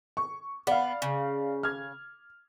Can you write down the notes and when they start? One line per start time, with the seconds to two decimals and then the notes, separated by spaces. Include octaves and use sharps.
0.17 C#6
0.67 B3 D5 F5
1.02 C#3
1.63 F6 G#6